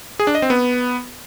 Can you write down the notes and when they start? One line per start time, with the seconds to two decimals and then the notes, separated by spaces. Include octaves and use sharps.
0.20 G#4
0.27 D4
0.35 D#5
0.42 C4
0.50 B3